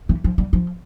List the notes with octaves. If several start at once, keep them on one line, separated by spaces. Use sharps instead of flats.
E3
F3
G3
F3